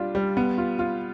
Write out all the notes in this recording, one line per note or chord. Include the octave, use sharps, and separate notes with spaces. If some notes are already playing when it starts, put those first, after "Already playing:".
Already playing: G3 D4 F4
G3
B3
F4
F4